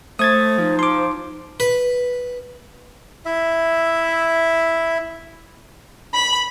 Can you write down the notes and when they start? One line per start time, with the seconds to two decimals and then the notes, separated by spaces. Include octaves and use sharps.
0.19 A3 C5 D#6 G#6 A6
0.58 F3 D#4
0.79 C6 D6
1.60 B4
3.25 E4 E5
6.14 B5